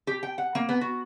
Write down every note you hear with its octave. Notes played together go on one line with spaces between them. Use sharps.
G4
G5
F#5
A#3
B3
F#4